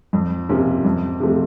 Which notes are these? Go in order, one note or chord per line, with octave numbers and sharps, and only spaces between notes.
F2
C3 F3 A#3 C#4
F2
C3 F3 A3